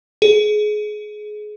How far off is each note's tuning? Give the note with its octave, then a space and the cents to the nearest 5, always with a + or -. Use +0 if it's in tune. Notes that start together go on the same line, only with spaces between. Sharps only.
G#4 +25